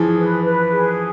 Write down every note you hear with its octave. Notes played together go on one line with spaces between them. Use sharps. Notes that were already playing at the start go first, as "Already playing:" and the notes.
Already playing: E3 F3 G#4
B4
B4
G#4